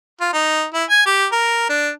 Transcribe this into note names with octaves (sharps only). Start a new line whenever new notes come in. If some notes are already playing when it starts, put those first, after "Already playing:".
F4
D#4
E4
G#5
G4
A#4
D4